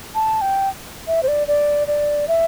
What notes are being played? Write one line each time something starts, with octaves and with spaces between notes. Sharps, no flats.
A5
G5
E5
C5
D5
D5
D5
E5